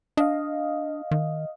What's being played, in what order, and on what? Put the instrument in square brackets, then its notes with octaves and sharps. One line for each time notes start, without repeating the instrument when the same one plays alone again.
[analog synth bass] D4 [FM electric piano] D#5 F5
[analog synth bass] D#3